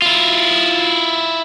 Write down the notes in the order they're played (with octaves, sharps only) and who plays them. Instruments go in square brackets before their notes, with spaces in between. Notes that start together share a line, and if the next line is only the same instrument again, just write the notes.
[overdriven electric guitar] E4 F4